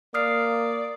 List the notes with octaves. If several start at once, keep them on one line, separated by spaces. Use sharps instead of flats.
A#3 D5 D#6 F6 C7